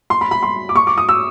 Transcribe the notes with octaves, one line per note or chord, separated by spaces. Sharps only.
C6
B5
B5
C6
D6
C#6
D6
D#6
E6